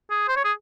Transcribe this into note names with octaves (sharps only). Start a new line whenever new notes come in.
G#4
C5
C#5
G#4